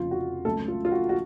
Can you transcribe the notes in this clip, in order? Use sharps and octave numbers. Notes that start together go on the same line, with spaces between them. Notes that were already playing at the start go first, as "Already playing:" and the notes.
Already playing: F1 F2 C#3 F3 F4
F#4
C#2 C#3 F#3 A3 A4
F4
F4
F#4
F#4